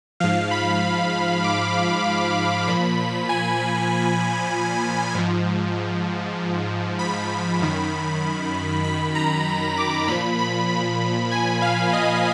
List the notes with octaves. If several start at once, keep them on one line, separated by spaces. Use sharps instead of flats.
G#2 F3 F5
B5
D6
A#2 F3 B5
G#5
G#2 F3
B5
F#2 D#3
B5
A#5
D6
A#2 F3 B5
B5
B5
G#5
F5
D#5